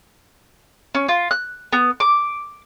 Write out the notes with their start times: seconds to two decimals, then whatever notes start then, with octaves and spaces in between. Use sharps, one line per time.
0.95 C#4
1.09 F4
1.31 F#6
1.73 B3
2.00 D6